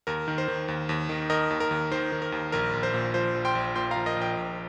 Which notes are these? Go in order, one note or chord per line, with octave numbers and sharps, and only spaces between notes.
D#2 A#4
D#3
C5
D#3
D#2
D#2
D#3
D#3 A#4 D#5
D#2
A#4
D#2
D#3 C5
D#3
A#4
D#2
A#1 A#4
A#1
C5
A#2
F3 C5
A#1
G5 C6
A#1
A#2 G5 C6
F3 F5 A#5
A#4 D#5
A#1 D#5 G5
A#1